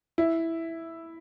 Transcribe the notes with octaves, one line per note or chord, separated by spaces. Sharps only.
E4